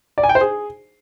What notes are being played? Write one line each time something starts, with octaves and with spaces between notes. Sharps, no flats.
D5
G#5
G5
C5
G#4